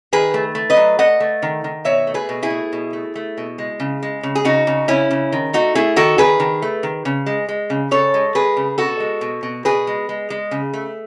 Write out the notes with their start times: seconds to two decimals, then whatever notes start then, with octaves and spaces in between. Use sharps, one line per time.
0.12 D#3 G#4 B4
0.34 A3
0.55 A3
0.70 B4 D#5
0.76 F#3
0.99 A3 D#5 F#5
1.20 A3
1.42 D#3
1.64 D#3
1.85 B2 C#5 E5
2.07 A3
2.14 G#4 B4
2.29 B2
2.43 E4 G#4
2.50 A3
2.73 B2
2.93 A3
3.16 A3
3.38 B2
3.58 G#3
3.80 C#3
4.03 G#3
4.23 C#3
4.35 G#4
4.45 C#3 D#4 F#4
4.67 C#3
4.88 C#3 C#4 E4
5.11 C#3
5.32 D#3
5.53 A3 D#4 F#4
5.75 A3 E4 G#4
5.96 D#3 F#4 A4
6.18 D#3 G#4 B4
6.40 D#3
6.62 A3
6.83 D#3
7.05 C#3
7.26 G#3
7.49 G#3
7.70 C#3
7.91 C#3 A4 C#5
8.14 G#3
8.35 G#3 G#4 B4
8.57 C#3
8.78 B2 F#4 A4
9.00 G#3
9.21 B2
9.43 B2
9.65 B2 G#4 B4
9.87 G#3
10.09 G#3
10.30 G#3
10.51 C#3
10.73 A3